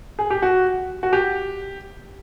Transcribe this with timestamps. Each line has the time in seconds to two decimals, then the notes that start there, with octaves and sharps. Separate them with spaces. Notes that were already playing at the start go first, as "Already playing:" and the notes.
0.19 G#4
0.30 G4
0.42 F#4
1.03 F#4
1.13 G4